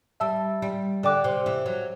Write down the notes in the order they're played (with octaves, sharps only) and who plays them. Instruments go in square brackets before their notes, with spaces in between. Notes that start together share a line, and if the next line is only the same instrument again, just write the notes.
[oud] G3 [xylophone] E5 A5 E6
[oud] G3
[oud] D3 [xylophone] D5 G5 D6 F#6
[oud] C3
E3
F#3